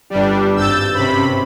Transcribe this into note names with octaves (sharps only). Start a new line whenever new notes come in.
G1 G3 D4 G4
G#1 G2 E6 G6 A6
C3 C#4 A#4 C5 B5